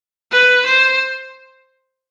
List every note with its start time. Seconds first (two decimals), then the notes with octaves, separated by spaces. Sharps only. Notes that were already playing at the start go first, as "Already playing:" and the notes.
0.32 B4
0.66 C5